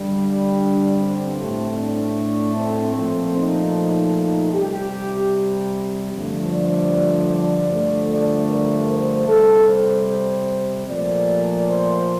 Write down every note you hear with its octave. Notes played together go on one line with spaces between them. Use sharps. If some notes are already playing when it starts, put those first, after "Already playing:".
Already playing: G2 D3 G3
D4
C4
A2 A3
D4
C4
A#2 F3 A3
D#4
D#4
C3 G3 G4
G2 D3 F3 A3
D5
D5
G2 D3 F3 A3
D5
A#4
C5
C3 G3 A4
C5
A#2 F3 A3 D5
C5